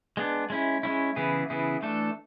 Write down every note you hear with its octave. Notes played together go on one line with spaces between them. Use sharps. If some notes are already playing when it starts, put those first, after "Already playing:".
G#3 B3 D4
G#3 C#4 E4
G#3 C#4 E4
C#3 E3 B3 E4 G#4
C#3 E3 B3 E4 G#4
E3 A3 D4 A4